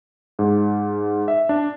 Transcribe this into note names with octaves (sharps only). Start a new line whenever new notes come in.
G#2
E5
D4